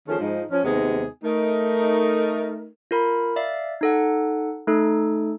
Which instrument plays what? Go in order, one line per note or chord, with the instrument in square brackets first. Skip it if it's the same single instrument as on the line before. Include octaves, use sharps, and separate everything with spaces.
[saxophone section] D#3 F3 A3 C#4 G#4 C5
G#2 F3 D#4
F3 C#4
D#2 C3 G#3 B3 D#4 G#4
A3 D#4 A#4
[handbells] F4 A#4 B5
D5 E5 F5
D#4 A4 F#5
A3 D#4 A4